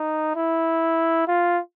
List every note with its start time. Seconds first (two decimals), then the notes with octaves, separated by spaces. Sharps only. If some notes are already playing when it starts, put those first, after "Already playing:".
Already playing: D#4
0.36 E4
1.28 F4